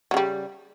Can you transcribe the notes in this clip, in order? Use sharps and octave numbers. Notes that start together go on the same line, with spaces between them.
C#3 F#3 G3